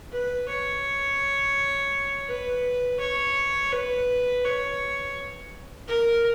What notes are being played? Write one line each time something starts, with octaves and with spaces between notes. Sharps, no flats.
B4
C#5
B4
C#5
B4
C#5
A#4